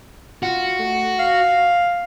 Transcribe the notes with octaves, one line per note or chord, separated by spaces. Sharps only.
F4 F#4
A3
F5